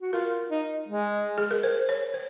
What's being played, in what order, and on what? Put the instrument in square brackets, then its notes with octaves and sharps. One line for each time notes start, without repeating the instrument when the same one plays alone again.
[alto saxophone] F#4
[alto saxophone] F4 [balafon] A#4
[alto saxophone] D#4
G#3
[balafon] G#4
A#4
C5
C#5
C5